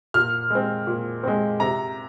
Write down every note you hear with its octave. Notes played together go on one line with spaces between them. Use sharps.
A#2 F6
G#3 C4
A#2
G#3 C4
C3 A#5